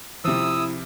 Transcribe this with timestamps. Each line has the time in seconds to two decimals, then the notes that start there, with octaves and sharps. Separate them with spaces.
0.25 C3 F3 E4 D#6 E6